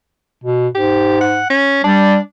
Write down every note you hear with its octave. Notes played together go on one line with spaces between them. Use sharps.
B2
G#2 G4
F#5
C#4
G3 D4